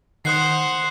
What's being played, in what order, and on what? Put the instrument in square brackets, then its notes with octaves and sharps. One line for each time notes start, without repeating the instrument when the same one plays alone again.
[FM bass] D#3 [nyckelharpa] C5 F#5 [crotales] D#6 F#6 C7